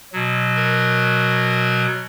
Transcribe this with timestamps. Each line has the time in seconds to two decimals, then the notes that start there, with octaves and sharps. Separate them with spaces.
0.12 B2 F#3
0.56 A#4